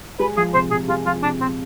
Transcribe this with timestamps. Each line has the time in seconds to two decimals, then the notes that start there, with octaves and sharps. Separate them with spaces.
0.19 G#3 B4
0.37 F3 G#4
0.54 C3 C5
0.71 C3 G#4
0.88 G#3 F4
1.06 F3 F4
1.23 C3 D4
1.41 C3 C4